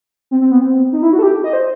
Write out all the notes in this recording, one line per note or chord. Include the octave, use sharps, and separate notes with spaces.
C4
C4
B3
C4
D#4
E4
F#4
A4
G4
D#5
C5